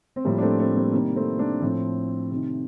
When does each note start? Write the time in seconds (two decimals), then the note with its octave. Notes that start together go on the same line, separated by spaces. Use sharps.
0.16 C4
0.24 A2 F3 G3 A#3
0.38 D4
0.42 A3 C4
0.59 A3 C4
0.76 G3 A#3
0.93 C3 D#3 G3 A#3
1.16 A3 C4
1.39 A#3 D4
1.62 A2 F3 A3 C4
2.31 C3 D#3